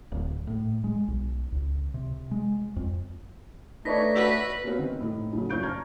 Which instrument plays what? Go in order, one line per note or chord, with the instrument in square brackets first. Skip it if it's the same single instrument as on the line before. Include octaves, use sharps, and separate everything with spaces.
[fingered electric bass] D1
A2
G#3
B1
C#2
C3
G#3
F2
[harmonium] A3 D4 [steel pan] D#4 B4 C#5 [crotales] A#6 B6
[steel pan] F#4 E5 [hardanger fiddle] B4
[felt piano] A#3 B3 C#4 F#4 B4 C5
D#3 C4
A2 D#4
C#3 F#3 A3
F#2 C5 C#6 G6 D7
A5 A#5 C#6 F6 G#6